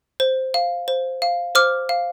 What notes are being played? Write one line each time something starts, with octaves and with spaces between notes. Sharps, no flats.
C5
F5
C5
F5
C5 D6 F6
F5